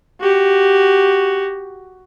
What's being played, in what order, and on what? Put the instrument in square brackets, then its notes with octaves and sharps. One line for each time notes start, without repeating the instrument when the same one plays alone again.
[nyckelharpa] F#4 G4